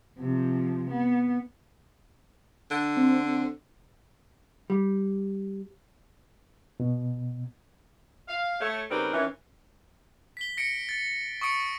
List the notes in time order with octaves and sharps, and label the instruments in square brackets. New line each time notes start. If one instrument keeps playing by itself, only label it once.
[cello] C3 F3
B3
[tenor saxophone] D3
[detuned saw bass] C4
[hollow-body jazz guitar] G3
[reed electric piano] B2
[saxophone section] F5
A3 C#5
C#3 G3 C4 D#4 A#4 B4
D#3 E3 C#4
[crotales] B6 G7
A#6 C#7 D7
A6
C#6 D#6 C#7 D7